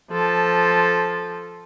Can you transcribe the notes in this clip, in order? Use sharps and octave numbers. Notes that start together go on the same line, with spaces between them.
F3 A4